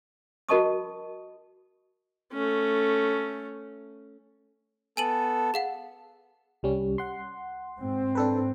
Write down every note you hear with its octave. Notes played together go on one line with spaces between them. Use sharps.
F#4 A#4 D#5 A5 C#6 D#6
A3 C#4
B3 A4 G#5 D#7 F#7
G#4 F5 F#5
C2 G3 C#4
F#5 C6
G#2 C4
D4 A4 B4